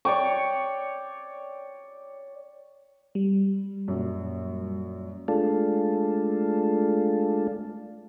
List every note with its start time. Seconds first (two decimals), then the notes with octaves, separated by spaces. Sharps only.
0.05 C#5 D5 G5 C#6
3.15 G3
3.88 F#2 A#2
5.28 G#3 A3 D4 F4 A4